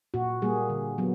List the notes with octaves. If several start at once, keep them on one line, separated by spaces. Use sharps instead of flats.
A#2 F#4
G3 A#3 G#4
D3
F#3 B3